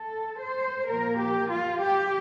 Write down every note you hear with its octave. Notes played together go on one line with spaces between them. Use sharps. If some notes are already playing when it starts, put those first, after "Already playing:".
Already playing: A4
C5
A#2 F3 A#3 A#4
G4
F4
G4